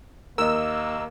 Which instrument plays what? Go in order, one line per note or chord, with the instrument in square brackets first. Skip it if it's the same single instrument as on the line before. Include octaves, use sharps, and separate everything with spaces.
[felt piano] D#2 [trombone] A#3 [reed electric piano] A#4 D#5 [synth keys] E6